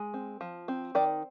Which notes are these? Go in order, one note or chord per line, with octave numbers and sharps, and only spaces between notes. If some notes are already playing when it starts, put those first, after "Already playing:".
Already playing: G#3
C4
F3
C4
D#3 D5